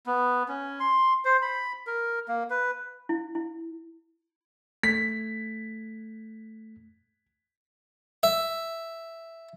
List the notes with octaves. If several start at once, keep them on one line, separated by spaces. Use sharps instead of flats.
B3
C#4
C6
C5
B5
A#4
A#3
B4
E4
E4
A3 B6
E5